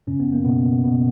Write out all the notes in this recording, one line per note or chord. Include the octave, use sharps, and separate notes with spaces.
F#2 C#3 C#4
B3
A#3
B2 B3
B2 B3